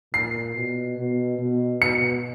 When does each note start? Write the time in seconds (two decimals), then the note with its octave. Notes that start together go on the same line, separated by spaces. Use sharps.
0.14 A#2 C7
0.55 B2
0.98 B2
1.39 B2
1.81 B2 C#7